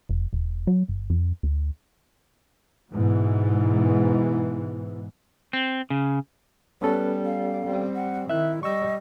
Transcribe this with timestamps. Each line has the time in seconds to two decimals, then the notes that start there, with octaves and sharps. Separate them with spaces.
0.09 F1
0.33 E1
0.67 F#3
0.88 G1
1.10 F2
1.43 D2
2.93 G#2 B2 E3
5.53 C4
5.90 C#3
6.82 G3 B3 C#4 A4 B4
7.25 F5
7.66 G3 C4
7.95 F#5
8.30 D#3 E4 E5 F#6
8.63 G3 D#5 C#6 E6